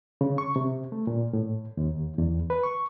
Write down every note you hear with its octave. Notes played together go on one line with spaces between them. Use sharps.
C#3
C#6
C3
A3
A#2
A2
D#2
E2
B4
C#6